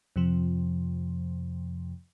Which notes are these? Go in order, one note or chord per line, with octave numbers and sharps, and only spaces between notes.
F2 C3 F3